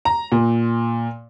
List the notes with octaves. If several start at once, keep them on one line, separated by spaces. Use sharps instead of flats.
A#5
A#2